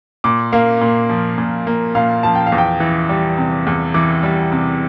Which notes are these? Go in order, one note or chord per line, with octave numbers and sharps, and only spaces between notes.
A#2 D6
A#3 F5
A#2
F3
A#2
A#3
A#2 F5
F3 A5
G5
F5
E2
G5
E3
G3
C3
E2
E3 D6
G3
C3